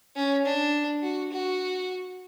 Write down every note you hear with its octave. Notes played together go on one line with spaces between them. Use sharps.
C#4
D4
F#4
F#4